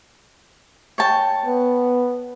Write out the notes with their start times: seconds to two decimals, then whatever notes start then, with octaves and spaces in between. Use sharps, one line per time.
0.98 C#5 G5 A5
1.46 B3